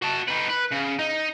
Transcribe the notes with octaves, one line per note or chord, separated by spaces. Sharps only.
F#4 A5
D#4 B4
B4
C#3
D#4